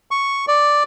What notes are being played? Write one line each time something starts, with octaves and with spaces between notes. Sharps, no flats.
C#6
D5